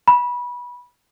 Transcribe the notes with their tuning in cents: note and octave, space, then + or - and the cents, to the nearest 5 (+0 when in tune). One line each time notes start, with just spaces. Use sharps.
B5 -20